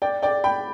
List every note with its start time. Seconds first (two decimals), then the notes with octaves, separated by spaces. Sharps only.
0.02 D5 G5
0.22 D5 G5
0.44 G5 B5